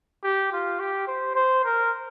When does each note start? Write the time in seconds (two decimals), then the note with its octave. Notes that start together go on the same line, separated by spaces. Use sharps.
0.23 G4
0.52 F4
0.79 G4
1.07 C5
1.35 C5
1.65 A#4